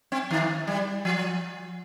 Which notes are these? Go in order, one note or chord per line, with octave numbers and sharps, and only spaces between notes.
C4
D#3
G3
F3